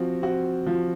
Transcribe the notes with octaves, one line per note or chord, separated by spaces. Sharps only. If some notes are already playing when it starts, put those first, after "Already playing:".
Already playing: F3 C4 F#4
C4 F#4
F3